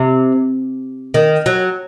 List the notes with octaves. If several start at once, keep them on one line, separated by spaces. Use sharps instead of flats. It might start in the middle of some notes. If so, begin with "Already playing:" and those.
Already playing: C3
D#3
F#3